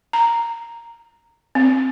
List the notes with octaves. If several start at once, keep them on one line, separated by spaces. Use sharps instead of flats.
A#5
C4